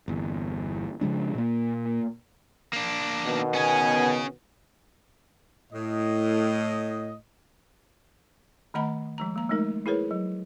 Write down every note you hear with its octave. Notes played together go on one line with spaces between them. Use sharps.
G1 E2
C#3 F3 G#3 D4
A#2 A#3
A#3 D4
B2 D#3 B3
C#4 G#4 G#5
A2 D#5
D#3 A3 D#5 F#5 A#5 B5
F3 G#3 A#5
A#3 A#5
G#3 A3 D#4 A#4
E4 G#4 A#4 B4 C#5
F#3